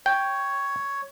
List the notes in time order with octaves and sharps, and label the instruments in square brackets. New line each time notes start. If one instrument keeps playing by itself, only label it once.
[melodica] C#5 [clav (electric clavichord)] G5